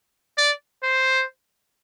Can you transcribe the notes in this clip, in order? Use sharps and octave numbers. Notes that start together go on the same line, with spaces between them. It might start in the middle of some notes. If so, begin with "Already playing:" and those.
D5
C5